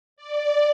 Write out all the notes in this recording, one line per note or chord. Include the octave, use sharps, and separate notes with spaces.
D5